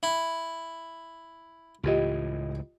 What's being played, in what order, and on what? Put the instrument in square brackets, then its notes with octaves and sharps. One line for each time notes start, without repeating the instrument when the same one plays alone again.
[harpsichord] E4
[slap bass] C#2 A2 E3 [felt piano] F4 G4 D#5